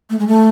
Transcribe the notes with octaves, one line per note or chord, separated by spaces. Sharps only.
A3
G#3
A3